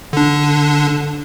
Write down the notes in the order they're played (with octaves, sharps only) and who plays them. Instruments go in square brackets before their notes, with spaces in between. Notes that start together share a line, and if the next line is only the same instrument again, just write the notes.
[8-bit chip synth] D3 D4